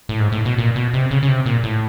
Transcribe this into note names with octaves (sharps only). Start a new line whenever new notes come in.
A2
G#2
A2
B2
A#2
B2
C3
C#3
C#3
C3
A#2
A2